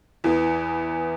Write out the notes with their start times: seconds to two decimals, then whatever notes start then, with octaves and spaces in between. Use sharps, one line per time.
0.24 E2 E3 B3